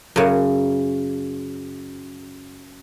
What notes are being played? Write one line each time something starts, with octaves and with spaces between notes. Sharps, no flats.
F#2 C#3